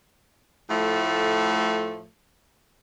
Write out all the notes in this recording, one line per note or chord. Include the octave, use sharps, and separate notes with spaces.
A2 F3 A3